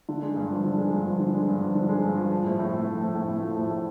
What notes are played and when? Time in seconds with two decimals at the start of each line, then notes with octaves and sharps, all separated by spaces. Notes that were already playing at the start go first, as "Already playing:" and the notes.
0.09 D3
0.22 G#3
0.36 G2
0.50 F3
0.64 D3
0.78 G#3
0.92 G2
1.06 F3
1.19 D3
1.34 G#3
1.48 G2
1.62 F3
1.75 D3
1.89 G#3
2.04 G2
2.17 F3
2.32 F3
2.45 A2
2.59 A2
2.74 A3
2.87 F3
3.01 A2
3.15 A2
3.28 A3
3.42 F3
3.57 A2
3.71 A2